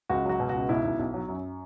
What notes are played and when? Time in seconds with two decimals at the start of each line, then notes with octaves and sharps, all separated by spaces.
0.09 C#2 F#4
0.25 F#3 F#4
0.40 B2
0.49 F#4
0.54 C#2
0.69 B1 E4
0.84 B1
0.99 B1
1.14 F#3
1.29 F#2